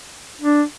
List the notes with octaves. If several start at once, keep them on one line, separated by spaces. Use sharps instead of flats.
D4